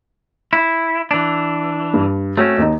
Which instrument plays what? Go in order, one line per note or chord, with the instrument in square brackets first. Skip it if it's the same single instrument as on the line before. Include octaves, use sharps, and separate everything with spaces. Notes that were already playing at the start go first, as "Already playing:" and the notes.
[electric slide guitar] E4
E3 D4
[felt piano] G2
[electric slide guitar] A3 C4 C#4 [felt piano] F#4 C#5
[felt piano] D#2 D#4